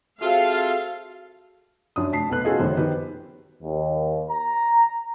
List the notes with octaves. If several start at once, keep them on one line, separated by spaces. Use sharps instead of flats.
C4 F4 F#4 G#4 A4 E5 F5
F#2 D4 D#6
F1 A5 B6 C7
F1 B1 A3 B4 F#6
C#4 F4 F#4 G#4 A4 D#5
G1 F#2 D#3 B3 C5
D#3 G4 B4
D#2
A#5